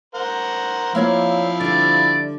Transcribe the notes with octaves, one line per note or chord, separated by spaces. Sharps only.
A#4 C5 F#5
F3 A#3 C4 E4 C#5 D5 F5
D3 G3 D5